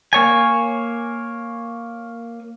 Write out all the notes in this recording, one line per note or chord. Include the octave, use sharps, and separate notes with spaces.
A#3 C#5 G#5